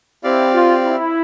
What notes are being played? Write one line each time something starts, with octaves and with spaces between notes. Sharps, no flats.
C4 E4 G4 D5 F5
F4
E4